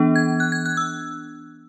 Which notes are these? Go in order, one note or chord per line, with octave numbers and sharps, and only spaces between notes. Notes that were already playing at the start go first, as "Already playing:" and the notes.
Already playing: E3 B3 D4
G#6
F#6
G#6
F#6
E6